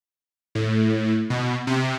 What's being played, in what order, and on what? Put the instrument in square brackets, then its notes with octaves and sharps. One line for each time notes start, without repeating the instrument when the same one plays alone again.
[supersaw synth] A2
B2
C3